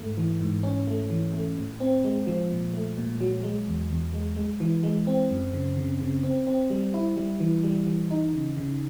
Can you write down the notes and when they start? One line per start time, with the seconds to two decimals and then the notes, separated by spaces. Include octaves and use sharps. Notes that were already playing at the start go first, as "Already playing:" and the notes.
Already playing: G#2 A3
0.17 E3
0.41 G#2
0.63 C#4
0.87 A3
1.10 E3
1.34 A3
1.57 A2
1.80 C4
2.04 G#3
2.27 F3
2.50 A#2
2.74 A3
2.97 A#2
3.21 F#3
3.43 G#3
3.67 E2
3.90 E2
4.14 G#3
4.37 G#3
4.60 E3
4.83 G#3
5.07 C4
5.30 F#2
5.53 C#3
5.77 C#3
6.00 C#3
6.23 C4
6.47 C4
6.70 G3
6.94 E4
7.17 G3
7.40 E3
7.64 G3
7.87 E3
8.10 D#4
8.33 C#3
8.57 C#3